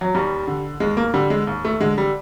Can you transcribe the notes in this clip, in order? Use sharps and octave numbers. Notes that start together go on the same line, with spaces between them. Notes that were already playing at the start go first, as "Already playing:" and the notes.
F#3
D#2 G3
D3
D#2 G#3
A#3
D3 G3
G#3
D#2
A3
D3 G#3
G3